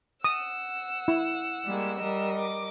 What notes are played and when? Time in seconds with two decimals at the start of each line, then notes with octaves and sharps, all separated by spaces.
0.24 F#5 D#6 E6
1.08 E4
1.65 G3 G#3 A#3
1.99 G3 A#4 D#5
2.38 D6